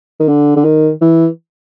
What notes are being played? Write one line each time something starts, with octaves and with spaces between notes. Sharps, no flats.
D#3
D3
D3
D#3
E3